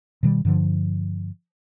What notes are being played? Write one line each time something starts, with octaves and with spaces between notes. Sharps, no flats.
B2 D#3 G3
G2 D3 F3